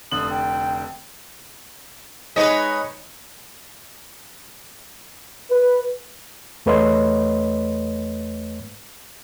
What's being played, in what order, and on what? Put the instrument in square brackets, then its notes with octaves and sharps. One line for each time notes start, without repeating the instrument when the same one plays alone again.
[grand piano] F1 D3 F#7 [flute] D#6
[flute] G5
[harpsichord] G#3 G#4 [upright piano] D#4 [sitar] B4 C#5 D#5
[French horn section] B4
[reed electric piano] E2 A3 B4 C#5 D#5 C6